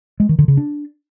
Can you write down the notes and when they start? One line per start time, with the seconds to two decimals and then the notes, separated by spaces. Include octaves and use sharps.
0.20 G#3
0.29 D#3
0.39 D3
0.48 C#3
0.57 D4